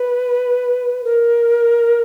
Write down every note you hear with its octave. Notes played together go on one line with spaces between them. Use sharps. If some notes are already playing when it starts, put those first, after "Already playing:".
Already playing: B4
A#4